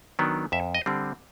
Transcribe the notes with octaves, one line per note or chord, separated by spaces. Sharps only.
D#3 F#3 B3 D4
F2 E5
D#5
D3 G3 C4